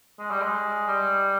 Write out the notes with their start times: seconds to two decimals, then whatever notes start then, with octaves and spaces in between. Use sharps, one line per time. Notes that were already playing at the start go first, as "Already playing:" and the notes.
0.19 G#3
0.31 G3
0.42 G#3
0.87 G3